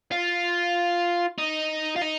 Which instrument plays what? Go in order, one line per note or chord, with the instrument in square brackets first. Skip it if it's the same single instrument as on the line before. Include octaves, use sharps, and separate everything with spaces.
[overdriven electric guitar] F4
D#4
F4
D#4